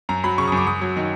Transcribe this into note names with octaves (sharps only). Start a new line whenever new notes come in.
F#2 A#5
F#3 B5
C#3 C#6
D#6
F#2
D6
F#2 D#6
F#3
D#3